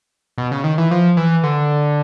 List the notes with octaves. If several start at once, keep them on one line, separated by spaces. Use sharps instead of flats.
B2
C#3
D#3
E3
F3
E3
D3